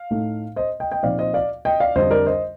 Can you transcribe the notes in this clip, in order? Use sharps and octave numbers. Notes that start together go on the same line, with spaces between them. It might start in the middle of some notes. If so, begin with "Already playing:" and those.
Already playing: F5
A2 A3 D#4
C5 D#5
D#5 G5
D#5 G5
A#2 F3 C4 D#4 D5 F5
C5 D#5
D5 F5
D#5 G5
D5 F5
F2 D3 G3 D4 C5 D#5
A#4 D5
C5 D#5